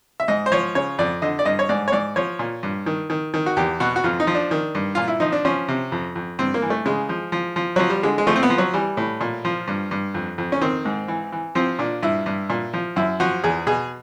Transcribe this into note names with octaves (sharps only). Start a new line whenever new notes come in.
E5
G#2 D#5
C5
F3 C#5
C#3 C#5
F2 D5
D3 D#5
D5
G2 D#5
C#5
G#2 D5
C#5
G#2 D5
F3 C#5
A#2
G2
D#3
D#3
D#3
F#4
E2 G4
B2 F#4
F#4
F2 F4
D#4
F3
D4
D#3
G2
A#2 F4
E4
F3 D#4
D4
F3 C#4
C3
F2
F2
G2 C4
A#3
E3
A3
C#3 G#3
F3
F3
F3
F3 F#3
G3
D3 G#3
G#3
F3 A3
C4
B3
F3
F#3
E3 G3
A2
A#2
F3
G2
G2
F2
F2
C#4
D#3 C4
G#2
E3
E3
F3 C4
A#2 D4
G2 E4
G2
A#2
F3
F#2 E4
F3 F#4
E2 G#4
B2 G#4